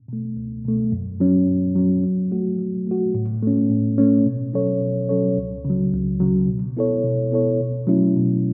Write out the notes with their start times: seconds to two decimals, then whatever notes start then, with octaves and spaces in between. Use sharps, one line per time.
0.08 B2 A3
0.37 C#2
0.65 B2 A3
0.92 F#2
1.20 F#3 C#4
1.47 F#2
1.76 F#3 C#4
2.04 F#3
2.32 A3 F#4
2.59 F#3
2.87 A3 F#4
3.14 A2
3.42 A3 C#4
3.70 A2
3.98 A3 C#4
4.26 B2
4.54 F#3 C#4 A4 C#5
4.81 B2
5.09 F#3 C#4 A4 C#5
5.37 C#2
5.65 C#3 F#3
5.93 C#2
6.20 C#3 F#3
6.48 B2
6.77 B3 E4 A4 C#5
7.04 B2
7.32 B3 E4 A4 C#5
7.60 B2
7.87 F#3 A3 C#4 E4
8.16 B2